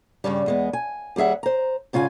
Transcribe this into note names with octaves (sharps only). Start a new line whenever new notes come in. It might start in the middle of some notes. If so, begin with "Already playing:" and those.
G2 A#2 C#3 G3
E2 G#3 B3
G#5
D#2 G3 G#4 E5 F#5
C5 A#5
G#2 C#3 F4 A#4 G#5